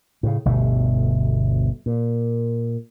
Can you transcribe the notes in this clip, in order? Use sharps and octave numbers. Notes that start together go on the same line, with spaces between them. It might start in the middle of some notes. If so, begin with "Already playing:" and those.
A2 C#3
G1 D2 B2 A3
A#2